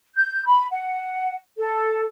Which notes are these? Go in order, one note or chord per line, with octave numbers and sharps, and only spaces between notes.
G6
B5
F#5
A4